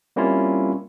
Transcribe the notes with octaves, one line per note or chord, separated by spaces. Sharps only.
G3 A#3 C4 C#4 E4 F4